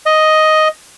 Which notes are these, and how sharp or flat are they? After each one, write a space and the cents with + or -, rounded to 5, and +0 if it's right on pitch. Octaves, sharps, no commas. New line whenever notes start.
D#5 +5